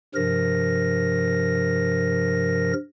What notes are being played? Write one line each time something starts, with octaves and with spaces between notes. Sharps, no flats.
G2 C3 F3 A#4 A#6